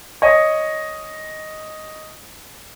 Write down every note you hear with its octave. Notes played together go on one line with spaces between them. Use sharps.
C#5 D#5